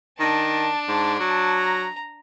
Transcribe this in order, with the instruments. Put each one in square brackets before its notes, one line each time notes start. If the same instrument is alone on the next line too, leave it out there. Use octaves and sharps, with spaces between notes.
[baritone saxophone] D#3 [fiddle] D4 A5
[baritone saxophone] G#2
F#3
[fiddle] A#5